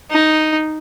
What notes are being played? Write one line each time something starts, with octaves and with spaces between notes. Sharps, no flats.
D#4